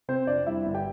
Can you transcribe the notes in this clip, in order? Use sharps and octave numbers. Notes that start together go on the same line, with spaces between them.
C3 C4 C5
F2 D4 D5
G3 E4 E5
G1
G4 G5